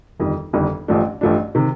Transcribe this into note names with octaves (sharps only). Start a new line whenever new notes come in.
G1 F2 D#3 G3
G1 F2 D#3 G3
A1 G2 F3 A3 D4
A1 G2 F3 A3 D4
C3 D#3